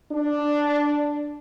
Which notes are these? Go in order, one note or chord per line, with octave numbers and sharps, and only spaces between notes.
D4